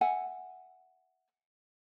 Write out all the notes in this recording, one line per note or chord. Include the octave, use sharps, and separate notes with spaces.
E5 F#5 G#5